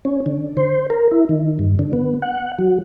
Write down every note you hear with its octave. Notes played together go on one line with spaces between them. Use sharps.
C#4
D3
C5
A#4
E4
D#3
G2
D3
B3
F#5
F#3